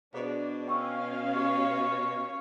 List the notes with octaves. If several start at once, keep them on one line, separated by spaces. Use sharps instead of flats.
B2 D4 G#4 C5 F5
C#4 F5 G5 C#6 E6
G4 C#5